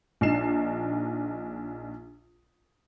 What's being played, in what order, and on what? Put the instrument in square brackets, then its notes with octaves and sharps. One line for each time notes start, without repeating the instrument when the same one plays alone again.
[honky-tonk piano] A#1 D4 D#4 C7 E7